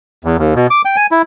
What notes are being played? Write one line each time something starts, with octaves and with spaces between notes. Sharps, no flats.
E2
D#2
B2
D6
G5
G#5
E4